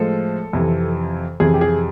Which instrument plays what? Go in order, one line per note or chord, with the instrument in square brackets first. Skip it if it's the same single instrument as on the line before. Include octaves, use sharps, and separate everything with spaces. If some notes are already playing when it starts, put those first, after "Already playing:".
Already playing: [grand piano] A2 F3 G#3 A4
F2 C3 E3
F2 C3 E3 G#4
G4
G#4